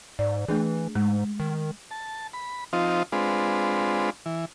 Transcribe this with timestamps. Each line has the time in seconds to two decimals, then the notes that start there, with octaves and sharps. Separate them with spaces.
0.19 G#2 D5
0.48 E3 A3 D4 G#4
0.95 G#2 G#3
1.40 D#3
1.91 A5
2.34 B5
2.73 F3 C4 D#4 F4
3.12 G#3 C4 D4 F4 B4
4.26 E3